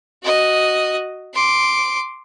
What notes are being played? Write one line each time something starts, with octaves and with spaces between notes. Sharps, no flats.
F#4 D#5
C6 D6